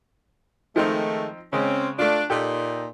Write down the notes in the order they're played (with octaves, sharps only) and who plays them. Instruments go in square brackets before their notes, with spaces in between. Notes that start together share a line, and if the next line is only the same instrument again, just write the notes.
[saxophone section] D#3 G#3 A3 [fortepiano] F3 C4 D#4
[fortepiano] C#3 G#3 [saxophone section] C4 C#4
[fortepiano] A3 F4 [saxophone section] D4
[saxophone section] A#2 D#4 [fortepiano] G4 A4